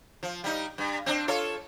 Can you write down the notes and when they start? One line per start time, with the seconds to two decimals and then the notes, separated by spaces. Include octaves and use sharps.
0.23 F3
0.44 G3 D#4
0.78 G2
1.06 C4 D4
1.28 F4 A4 C#5